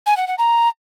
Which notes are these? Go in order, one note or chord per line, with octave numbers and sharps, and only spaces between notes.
G#5
F#5
F#5
A#5